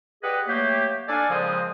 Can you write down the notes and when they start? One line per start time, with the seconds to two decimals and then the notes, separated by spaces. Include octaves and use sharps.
0.23 G4 G#4 B4 D5 D#5 F#5
0.48 F#3 A3 A#3 F#4 G4
1.08 D4 A4 D5 F5 G#5
1.30 A#2 C#3 F3 G#3 C4 D#6